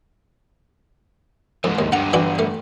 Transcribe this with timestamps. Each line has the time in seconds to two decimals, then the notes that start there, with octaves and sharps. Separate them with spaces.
1.64 F2 G#2 E3
1.79 D#2
1.92 G2 D3 F#5 A#5
2.13 E3 D4 F#4
2.39 A3